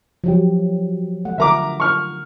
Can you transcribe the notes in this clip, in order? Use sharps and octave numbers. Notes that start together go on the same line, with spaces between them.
F3 F#3 G4
A3 F#5
D3 A#4 E5 A#5 D6
C#6 F6